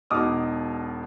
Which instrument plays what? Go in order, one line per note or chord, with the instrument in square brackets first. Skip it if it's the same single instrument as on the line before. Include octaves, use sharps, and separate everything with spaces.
[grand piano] E1 B2 D#4 D6 D#6 F6